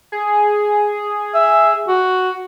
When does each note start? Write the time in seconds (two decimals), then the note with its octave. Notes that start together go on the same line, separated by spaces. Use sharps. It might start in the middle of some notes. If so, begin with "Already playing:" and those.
0.12 G#4
1.34 E5
1.88 F#4